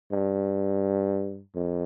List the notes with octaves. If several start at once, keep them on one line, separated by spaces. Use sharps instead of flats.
G2
F2